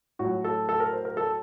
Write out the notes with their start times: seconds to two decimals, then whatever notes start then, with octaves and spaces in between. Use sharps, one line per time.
0.19 A2 F#4
0.25 F#3
0.44 A4
0.69 A4
0.80 A#4
0.93 C5
1.05 A#4
1.17 A4